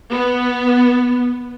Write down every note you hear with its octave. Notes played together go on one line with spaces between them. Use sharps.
B3